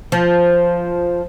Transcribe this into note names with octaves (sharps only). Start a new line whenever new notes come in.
F3